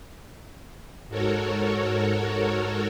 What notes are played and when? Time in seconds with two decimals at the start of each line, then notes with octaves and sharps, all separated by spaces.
1.08 G#2 F#4 A4 A#4 C#5